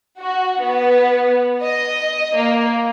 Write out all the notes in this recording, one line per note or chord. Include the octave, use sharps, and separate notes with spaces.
F#4
B3
D#5
A#3